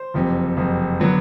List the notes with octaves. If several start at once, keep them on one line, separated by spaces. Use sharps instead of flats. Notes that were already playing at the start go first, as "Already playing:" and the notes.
Already playing: C5
F#1 F2 C3
F#1 F2 C3
D3 F#3 B3